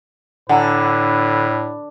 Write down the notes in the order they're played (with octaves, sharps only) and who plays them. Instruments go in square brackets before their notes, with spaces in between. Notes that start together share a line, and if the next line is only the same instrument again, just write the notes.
[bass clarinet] A2 [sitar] D3 [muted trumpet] B4 [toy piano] F#5 G#5 A#5